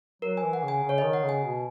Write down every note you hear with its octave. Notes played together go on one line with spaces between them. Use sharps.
F#3 A#4
G#5
E3
F#5
C#3 G#5
C#3
C#5
D#5
D#3
F#5
C#3 G#5
B2